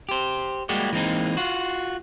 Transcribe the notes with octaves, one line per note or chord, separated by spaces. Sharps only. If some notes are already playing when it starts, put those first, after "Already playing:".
G4 C5
G3 G#3 A#3 F#4 G4
E3 G#3 A#3 C4 D#4
F4 F#4